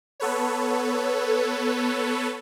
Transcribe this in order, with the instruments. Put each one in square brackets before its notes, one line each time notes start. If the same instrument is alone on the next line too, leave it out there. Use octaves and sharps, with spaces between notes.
[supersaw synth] B3 A4 B4 C#5